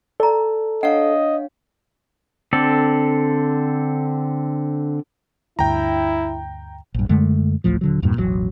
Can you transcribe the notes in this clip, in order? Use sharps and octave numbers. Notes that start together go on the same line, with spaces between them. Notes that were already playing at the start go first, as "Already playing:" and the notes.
A4 D5 A#5
D4 C#5 D#5 F5 F#5
D3 C4 A4 D5
D2 G2 E4 G5 A#5
A#1 G2
F#2 D3 G#3 A3
A1 D2 A2 F3
D#1 D3 F#3
E2 G2 A#2 G3
E1 A1 G#2 F#3